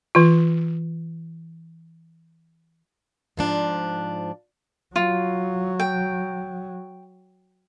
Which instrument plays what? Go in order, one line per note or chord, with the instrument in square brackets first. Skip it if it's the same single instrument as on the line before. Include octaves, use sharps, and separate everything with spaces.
[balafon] E3 F4
[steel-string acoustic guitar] G#2 F3 D4
[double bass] F#3 [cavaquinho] F4
[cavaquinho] G5